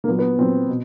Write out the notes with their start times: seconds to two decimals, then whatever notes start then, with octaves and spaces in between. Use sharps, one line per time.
0.04 A#3
0.08 A#2 F#3 B3
0.19 B3
0.38 A#2 F#3 C4
0.69 B2